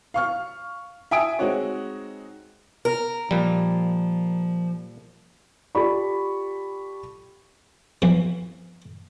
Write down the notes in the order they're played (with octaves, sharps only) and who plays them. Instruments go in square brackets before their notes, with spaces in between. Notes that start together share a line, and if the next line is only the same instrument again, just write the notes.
[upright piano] F5 C#6 F6
E5 G5 G#5 D#6 D7
G#3 C4 D#4 F#4 C#5
[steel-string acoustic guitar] A#4
[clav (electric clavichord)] A#2 G3 [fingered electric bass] F3
[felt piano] F4 G4 A4 D5 B5 C#6
[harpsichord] F2 B2 E3 F3